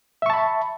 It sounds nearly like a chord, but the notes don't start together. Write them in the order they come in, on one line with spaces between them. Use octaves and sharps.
E5 C#6 A5 B5